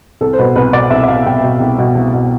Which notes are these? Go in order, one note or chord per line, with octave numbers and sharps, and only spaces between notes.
C2 A4
C5
B2 B4
C2 B4
B2 D5
C2 E5
E5
B2 F5
C2 G5
B2
C2
B2
C2
B2